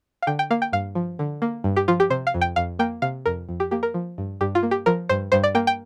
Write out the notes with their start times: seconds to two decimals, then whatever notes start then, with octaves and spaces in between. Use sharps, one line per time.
0.22 F5
0.27 D3 G5
0.39 G5
0.51 A#3 F5
0.62 G5
0.73 G2 F5
0.95 F3
1.19 D3
1.42 A#3
1.64 G2
1.76 G4
1.88 F3 F4
2.00 G4
2.10 C3 C5
2.27 F5
2.34 F2
2.41 G5
2.56 F2 F5
2.79 A#3 G5
3.02 C3 F5
3.26 F2 A#4
3.49 F2
3.60 G4
3.71 A#3 G4
3.83 A#4
3.94 F3
4.18 G2
4.41 G2 G4
4.55 F4
4.63 A#3
4.71 G4
4.86 F3 A#4
5.09 G2 C5
5.32 G2 C5
5.44 D5
5.55 A#3 G5
5.67 G5